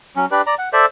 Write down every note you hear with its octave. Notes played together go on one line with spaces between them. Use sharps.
F#3 C#4
D4 G4 B4 D5
D5 A#5
F#5
A4 C5 D5 E5